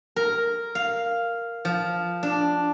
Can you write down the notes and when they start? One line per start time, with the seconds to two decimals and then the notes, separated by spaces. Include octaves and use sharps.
0.16 A#4
0.75 F5
1.65 F3
2.23 D4